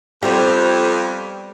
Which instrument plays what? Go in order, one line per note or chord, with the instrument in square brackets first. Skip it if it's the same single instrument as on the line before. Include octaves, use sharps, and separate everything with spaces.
[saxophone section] F2 [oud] G3 B3 C4 [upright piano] G4